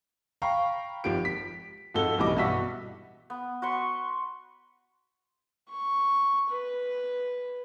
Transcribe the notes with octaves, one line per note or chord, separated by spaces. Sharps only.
F5 G5 A#5 B5 C#6
G#1 F3 G4 D7
B6
F2 G#2 F3 F#4 A4 G7
B1 A2 E3 G3 D#5 D6
G2 B2 F#4 E5 C#6 B6
B3
F#4 B4 C6 C#6
C#6
B4